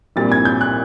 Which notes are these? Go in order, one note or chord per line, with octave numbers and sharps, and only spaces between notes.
A#1 A#2 G3 C4 A6
G#6
G6
F#6